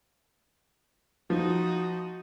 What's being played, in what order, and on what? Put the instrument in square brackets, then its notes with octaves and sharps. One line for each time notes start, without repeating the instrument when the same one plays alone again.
[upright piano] F3 [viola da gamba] D#4 F#4